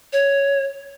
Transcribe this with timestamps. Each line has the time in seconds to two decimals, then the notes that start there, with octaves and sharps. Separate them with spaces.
0.13 C#5